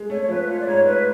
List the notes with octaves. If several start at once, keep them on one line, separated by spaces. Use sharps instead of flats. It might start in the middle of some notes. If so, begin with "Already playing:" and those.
Already playing: G#3
A3 C#5
C#5
F3 B4
F4 C#5
D5
G#2 C#5
A3 B4